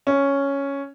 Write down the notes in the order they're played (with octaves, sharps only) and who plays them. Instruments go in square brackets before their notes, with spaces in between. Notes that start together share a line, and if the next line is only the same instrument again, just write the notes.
[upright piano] C#4